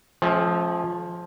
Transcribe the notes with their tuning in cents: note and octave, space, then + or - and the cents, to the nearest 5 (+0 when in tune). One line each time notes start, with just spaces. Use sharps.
F3 +0 A3 -45 C#4 -30